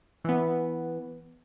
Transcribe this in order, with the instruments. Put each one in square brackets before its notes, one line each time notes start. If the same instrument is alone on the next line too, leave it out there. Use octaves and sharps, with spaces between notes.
[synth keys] E3 B3